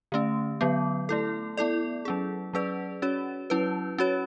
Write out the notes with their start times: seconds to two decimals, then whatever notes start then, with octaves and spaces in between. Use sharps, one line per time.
0.12 D3 A3 C#4
0.61 D3 F#3 B3
1.09 A3 E4 A4
1.57 B3 E4 A4 D5
2.05 F#3 C#4 G#4
2.53 F#3 C#4 G#4 B4 D5
3.02 C#4 F#4 C#5
3.50 F#3 C#4 E4 B4
3.98 C#4 F#4 C#5